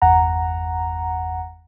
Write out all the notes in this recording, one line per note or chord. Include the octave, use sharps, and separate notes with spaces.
G1 E2 F#5 A#5